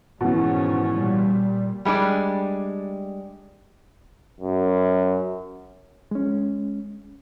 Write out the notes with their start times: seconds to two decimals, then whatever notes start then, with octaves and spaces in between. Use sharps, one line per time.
0.21 G#2 B2 D#3 E3 C#4
0.93 A#2 G3
1.85 G3 G#3 D4 D5
4.40 F#2
6.11 G#3 C#4